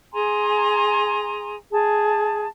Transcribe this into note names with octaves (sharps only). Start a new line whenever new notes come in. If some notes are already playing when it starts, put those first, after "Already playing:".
G#4 G#5 A#5 C6
G#4 A5